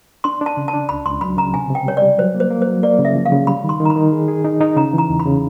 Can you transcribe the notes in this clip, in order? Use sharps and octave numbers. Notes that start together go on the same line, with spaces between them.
D4 C6
D4
A5
C#3
A5
D4
C#2 B5
C#2 C6
F#3 B5
C#3 A#5
C3 G#5
C3
G5
G3 C#5
D5
G3
F#3 C5
A#3
C5
A#3
C5
F#3
A#3 D5
C#3
E5
F3
F5
C#3
G3 B5
D#3
C6
D#3
A#5
B5
D#3
G#4
G#4
D#4
D#4
C#3 A#5
E3 A#5
E2
B5
C#3